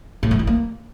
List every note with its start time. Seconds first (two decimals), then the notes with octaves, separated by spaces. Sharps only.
0.23 A2
0.31 F3
0.39 E3
0.47 A#3